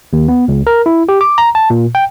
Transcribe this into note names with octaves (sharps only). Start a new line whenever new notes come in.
D#2
B3
C#2
A#4
E4
G4
D6
A#5
A5
A#2
G5